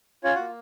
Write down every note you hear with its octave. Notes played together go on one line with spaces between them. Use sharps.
C#4 F4 C#5
A#3 F#4 F#5